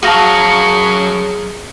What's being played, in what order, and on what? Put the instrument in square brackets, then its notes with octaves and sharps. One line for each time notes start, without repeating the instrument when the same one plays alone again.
[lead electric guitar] F#2 F#3 [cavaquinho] F#4 F5 [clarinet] G#4 [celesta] A5 A#6 D#7